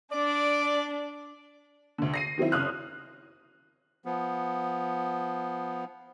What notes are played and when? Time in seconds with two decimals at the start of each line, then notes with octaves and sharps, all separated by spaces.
0.12 D4 D5
1.98 D2 D3
2.14 A#6 C7 D#7
2.38 D#3 F#3 C4 E4
2.52 F#1 D#6 F6 F#6
4.05 F3 B3